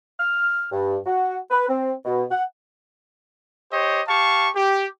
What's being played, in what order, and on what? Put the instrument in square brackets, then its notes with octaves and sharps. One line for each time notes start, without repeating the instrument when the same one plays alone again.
[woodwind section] F6
G2
F#4
B4
C4
B2
F#5
[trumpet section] G4 C5 C#5 D#5
G4 F5 A5 C#6
G4